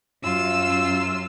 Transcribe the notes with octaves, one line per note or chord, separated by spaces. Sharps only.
F#2 F4 E6